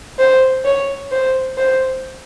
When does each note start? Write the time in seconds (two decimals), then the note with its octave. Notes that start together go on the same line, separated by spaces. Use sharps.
0.19 C5
0.65 C#5
1.11 C5
1.57 C5